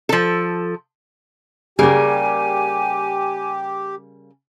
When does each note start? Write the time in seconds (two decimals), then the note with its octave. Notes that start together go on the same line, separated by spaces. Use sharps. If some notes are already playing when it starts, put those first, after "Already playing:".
0.09 F3 A4
1.79 C#3 G3 A#3 G4 G#4 A#4 G#5